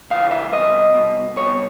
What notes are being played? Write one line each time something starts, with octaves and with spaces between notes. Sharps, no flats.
C#2 C#3 E3 F5
E5
C2 B2 D#5
C2 B2
C2 B2 C#5